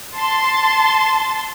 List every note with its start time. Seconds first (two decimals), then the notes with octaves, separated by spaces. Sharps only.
0.16 A5 C6